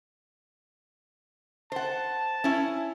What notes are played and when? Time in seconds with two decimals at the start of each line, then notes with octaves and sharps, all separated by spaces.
1.72 C5 F#5 A5
2.44 C#4 E4